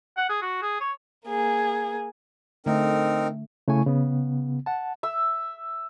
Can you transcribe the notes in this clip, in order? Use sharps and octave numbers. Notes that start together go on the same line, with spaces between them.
F#5
G#4
F#4
G#4
C#5
A#3 G#4
D3 A3 C4 D#4 A#4
C#3 A3 E4 G#5 C#6
C#3 B3
F#5 A5
E5 E6